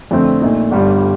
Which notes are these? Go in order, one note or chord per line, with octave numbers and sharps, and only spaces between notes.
F2 D3 A3 C4
A#2 A3 D#4
G1 G2 D3 G3